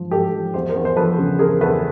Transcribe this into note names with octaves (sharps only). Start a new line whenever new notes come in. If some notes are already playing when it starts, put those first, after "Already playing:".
Already playing: G#2 F3
G#2 G4 A4
F3
E2 C5
A#4 C5
E2
C5
F3 A4 B4
C#3
E2 G#4 A#4
E2 A4 B4